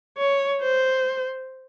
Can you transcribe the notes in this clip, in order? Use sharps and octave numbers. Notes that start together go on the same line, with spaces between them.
C#5
C5